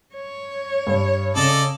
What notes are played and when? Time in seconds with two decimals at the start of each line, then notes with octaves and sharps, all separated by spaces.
0.15 C#5
0.87 G2
1.36 C#3 A4 D5 D#5